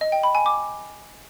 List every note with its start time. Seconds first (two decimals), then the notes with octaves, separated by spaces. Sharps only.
0.01 D#5
0.12 G5
0.23 B5
0.35 G#5
0.46 D6